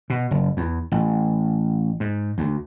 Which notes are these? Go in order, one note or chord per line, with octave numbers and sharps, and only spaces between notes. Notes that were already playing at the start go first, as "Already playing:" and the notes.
B2
F#1
E2
A1
G#2
D2